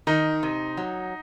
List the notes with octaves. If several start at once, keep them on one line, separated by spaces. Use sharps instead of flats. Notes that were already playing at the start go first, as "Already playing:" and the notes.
D#3 D#4
C3
F#3